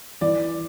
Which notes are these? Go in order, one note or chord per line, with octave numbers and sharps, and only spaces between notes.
E3 D5